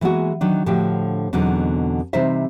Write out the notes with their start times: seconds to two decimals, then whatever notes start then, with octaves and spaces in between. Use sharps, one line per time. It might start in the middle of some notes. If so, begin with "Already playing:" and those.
0.01 E3 G#3 A#3 B3 F#4
0.41 D#3 F#3 D4
0.66 A2 D3 F3 D4 F#4 G4
1.33 E2 B2 D3 F#3 C4 D#4
2.13 C3 E3 G3 D#4 C5 E5